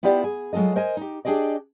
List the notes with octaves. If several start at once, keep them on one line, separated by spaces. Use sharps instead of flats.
B3 E4 F4 G4 D5
G#4
F#3 G#3 F4 A4 D#5
A#4 C5 D#5 G#5
D#4 G4
D4 G4 G#4 D5 D#5